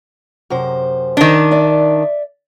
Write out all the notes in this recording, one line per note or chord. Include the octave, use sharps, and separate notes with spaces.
F#2 C3 C5
D#3 D4
D5 E5